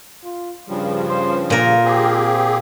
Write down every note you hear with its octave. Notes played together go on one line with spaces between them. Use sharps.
F4
G2 C#3 F3 G3
C5
A#2 F4 A#4
C4 G4 G#4